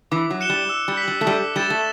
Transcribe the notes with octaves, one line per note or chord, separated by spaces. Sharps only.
E3 D6
F#3
F#6 C#7 E7 G7
G3
E6
G3
B6 F#7
G3
A3
G3 E6
G3 A6 E7 G7
A3